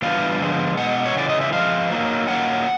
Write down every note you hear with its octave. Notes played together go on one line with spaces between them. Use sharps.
E3 G3 B3 D4 F4 F5
D3 F3 G#3 B3
B2 G#3 F#5
C#5
C#3 E3 G#3 D5
D#5
E5
F3 G#3 C4 F5
F#3 A#3 D#4
D#3 F#3 A#3 C#4 F#5